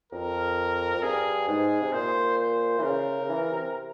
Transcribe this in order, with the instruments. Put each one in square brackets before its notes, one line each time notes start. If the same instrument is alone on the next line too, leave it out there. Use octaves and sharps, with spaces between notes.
[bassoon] F2 [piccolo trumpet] A#4
[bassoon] F2
[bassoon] G2 [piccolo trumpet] G#4
[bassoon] G#2 [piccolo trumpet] G#4
[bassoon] C3
[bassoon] A#2 [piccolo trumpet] C5
[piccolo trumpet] C5
[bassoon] E3
[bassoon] C#3 [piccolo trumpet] A#4
[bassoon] C#3
E3
C3